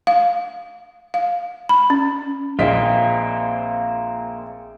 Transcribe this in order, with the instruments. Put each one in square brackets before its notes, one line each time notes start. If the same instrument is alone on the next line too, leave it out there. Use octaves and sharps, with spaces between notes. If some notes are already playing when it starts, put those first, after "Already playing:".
[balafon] F5
F5
B5
C#4
[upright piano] A#1 D#5 B6 [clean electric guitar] A#3 C4 F4 [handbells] G#4 E5